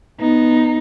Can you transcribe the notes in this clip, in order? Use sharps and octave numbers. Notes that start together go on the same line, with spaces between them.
B3 D#4